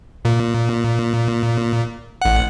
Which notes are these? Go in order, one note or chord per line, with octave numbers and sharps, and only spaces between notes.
A#2
A1 F#5